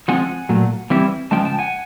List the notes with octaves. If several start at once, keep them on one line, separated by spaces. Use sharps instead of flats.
F3 G#3 C4 F4 F#5 G#5
A#2 F#3 A3
E3 G3 C4 E4
C#3 F3 G#3 G5 A5
G5 A5
F#5 G#5